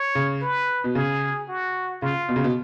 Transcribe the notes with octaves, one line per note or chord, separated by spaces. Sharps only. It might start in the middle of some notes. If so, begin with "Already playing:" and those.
Already playing: C#5
C#3
B4
B2
C#3 G#4
F#4
C#3 F4
B2
C#3
B2